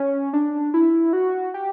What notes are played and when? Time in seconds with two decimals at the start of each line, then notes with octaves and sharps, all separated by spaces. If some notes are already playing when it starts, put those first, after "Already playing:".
Already playing: C#4
0.33 D4
0.74 E4
1.13 F#4
1.54 G4